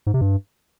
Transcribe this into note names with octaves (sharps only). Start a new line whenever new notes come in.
G#2
C3
G2